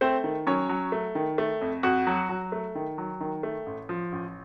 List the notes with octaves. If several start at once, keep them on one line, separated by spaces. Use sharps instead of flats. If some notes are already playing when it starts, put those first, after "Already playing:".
A3 C4 C5
D#3
F#3 C#4 C#5
F#3
A3
D#3
A3
F2
F2 F#4 F#5
F#3
F#3
A3
D#3
F#3
D#3
A3
A1
F3
A1